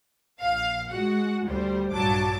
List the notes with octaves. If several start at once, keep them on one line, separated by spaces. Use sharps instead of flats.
A#1 F5
G#3 F#4 F#5
D2 G3 C5
A#1 G2 F#3 A5 D6